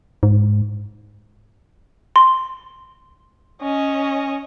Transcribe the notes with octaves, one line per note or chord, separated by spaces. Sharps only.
G#2
C6
C#4 D#5